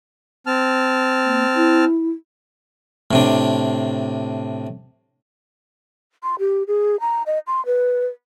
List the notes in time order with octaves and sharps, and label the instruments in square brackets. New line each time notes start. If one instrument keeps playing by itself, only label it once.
[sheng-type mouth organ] C4 A5 F6
[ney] A#3
E4
[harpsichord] A2 C3 D4
[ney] C6
G4
G#4
A#5
D#5
C6
B4